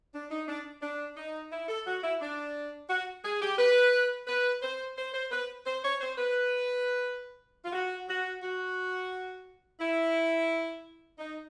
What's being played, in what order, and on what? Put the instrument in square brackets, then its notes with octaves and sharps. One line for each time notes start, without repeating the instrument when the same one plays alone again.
[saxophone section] D4
D#4
D4
D4
D#4
E4
A4
F#4
E4
D4
F#4
G#4
G4
B4
B4
C5
C5
C5
B4
C5
C#5
C5
B4
F4
F#4
F#4
F#4
E4
D#4